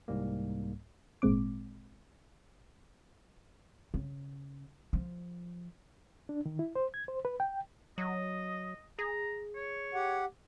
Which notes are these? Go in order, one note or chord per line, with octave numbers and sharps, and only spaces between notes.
C2 G#2 G3 A#3
G#1 A#2 G#3 C4 D6
C#3
F3
D4
D#3
E4
C5
G#6
C5
B4
G5
F#3 D#5
G#4 A#5
C#5
G4 F#5